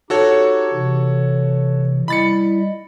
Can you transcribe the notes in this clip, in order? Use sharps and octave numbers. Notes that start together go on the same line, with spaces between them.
D#4 F#4 G4 A4 C#5
C3 E3
G3 E4 D#5 B5 A6 C#7